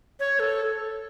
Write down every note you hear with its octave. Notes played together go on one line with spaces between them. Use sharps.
C#5
A4